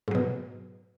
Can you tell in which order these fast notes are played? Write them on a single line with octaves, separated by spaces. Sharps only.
G#2 F#3 B2